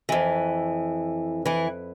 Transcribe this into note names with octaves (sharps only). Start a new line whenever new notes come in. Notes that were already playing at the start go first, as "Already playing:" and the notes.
F2 E3
E3 E4